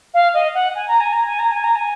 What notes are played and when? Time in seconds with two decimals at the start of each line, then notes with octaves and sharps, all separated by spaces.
0.14 F5
0.34 D#5
0.54 F#5
0.75 G#5
0.88 A#5
1.00 G#5
1.13 A#5
1.26 G#5
1.39 A#5
1.51 G#5
1.64 A#5
1.76 G#5